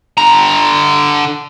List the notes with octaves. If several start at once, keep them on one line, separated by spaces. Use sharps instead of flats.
D3 A#5